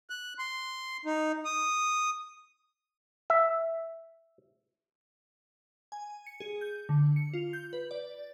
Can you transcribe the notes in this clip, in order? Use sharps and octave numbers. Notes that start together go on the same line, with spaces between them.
F#6
C6
D#4
D#6
E5
G#5
C#7
G#4
G6
D3
C#7
F4
G6
B4
D5